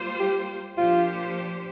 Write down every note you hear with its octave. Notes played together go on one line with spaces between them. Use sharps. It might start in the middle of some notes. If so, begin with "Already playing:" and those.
Already playing: G3 A#3 F4 C5
G4
A#2 F3 D4 F4 G4 C5